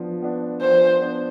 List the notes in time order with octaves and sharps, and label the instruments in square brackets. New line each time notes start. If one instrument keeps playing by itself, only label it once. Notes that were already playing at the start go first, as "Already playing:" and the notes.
Already playing: [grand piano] F3 B3 D4
B3 D4
[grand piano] F3 [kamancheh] C5
[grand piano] B3 D4